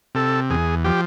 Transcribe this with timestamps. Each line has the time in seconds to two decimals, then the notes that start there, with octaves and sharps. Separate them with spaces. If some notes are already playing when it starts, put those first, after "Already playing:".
0.15 C3 A4
0.50 E2 G#4
0.84 F3 G4